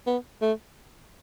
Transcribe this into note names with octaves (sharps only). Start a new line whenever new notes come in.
B3
A3